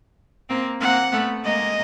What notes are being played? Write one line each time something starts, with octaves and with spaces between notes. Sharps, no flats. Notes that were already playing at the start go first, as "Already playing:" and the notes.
A#3 C4
A#3 C4 F#5
A3 B3
G#3 A#3 D#5